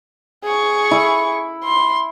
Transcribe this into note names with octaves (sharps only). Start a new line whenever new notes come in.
G#4 C#6
E4
C6